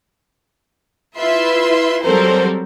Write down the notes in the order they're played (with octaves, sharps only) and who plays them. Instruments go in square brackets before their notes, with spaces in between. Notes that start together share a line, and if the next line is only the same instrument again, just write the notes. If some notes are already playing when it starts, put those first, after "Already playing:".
[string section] E4 F4 B4 E5 C6
F#3 G3 C4 A4 A#4 C5